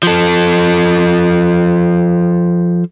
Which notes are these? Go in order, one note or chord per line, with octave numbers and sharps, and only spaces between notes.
F3 A4